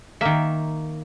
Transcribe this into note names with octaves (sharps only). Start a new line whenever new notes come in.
D#3 A#3 E5